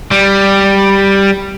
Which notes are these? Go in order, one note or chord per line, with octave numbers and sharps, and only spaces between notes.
G3